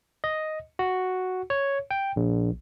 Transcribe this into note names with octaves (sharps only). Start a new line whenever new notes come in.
D#5
F#4
C#5
G5
A#1